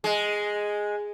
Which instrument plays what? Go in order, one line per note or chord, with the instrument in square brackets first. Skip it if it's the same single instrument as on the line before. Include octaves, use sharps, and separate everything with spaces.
[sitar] G#3